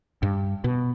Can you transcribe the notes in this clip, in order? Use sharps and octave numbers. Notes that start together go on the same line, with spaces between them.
G2
B2